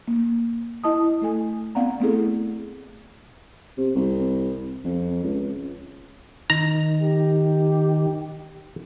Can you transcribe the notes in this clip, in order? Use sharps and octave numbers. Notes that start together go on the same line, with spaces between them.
A#3
E4 D#5 A5 D#6
A3 A4 G#5
B3 C4 D5 F5 F#5 A#5
A3 B3 C4 E4 G#4 A4
C3
C2
F2
C#2
D#3 A#5
G4